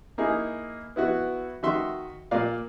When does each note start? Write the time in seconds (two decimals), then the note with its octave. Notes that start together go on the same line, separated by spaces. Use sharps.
0.18 A#3 D#4 E4 G#4
0.96 B3 E4 F#4
1.63 D#3 F#4 E5 C6
2.31 A#2 A#4 D5 F5